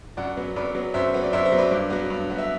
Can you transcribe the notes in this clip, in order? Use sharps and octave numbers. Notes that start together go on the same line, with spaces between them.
F#2 D5 F#5
F#3 B3
F#2 B4 D5
F#3 B3
F#2 C5 E5
F#3 B3
D5
F#2 C5 E5
C5 E5
F#3 B3
B4 D5
G2
F#3 B3
G2
F#3 B3
E5